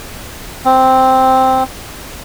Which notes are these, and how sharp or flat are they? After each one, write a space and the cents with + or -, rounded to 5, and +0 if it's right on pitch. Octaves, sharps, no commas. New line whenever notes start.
C4 +0